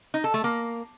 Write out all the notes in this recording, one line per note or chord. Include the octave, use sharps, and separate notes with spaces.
D#4
A4
A3
A#3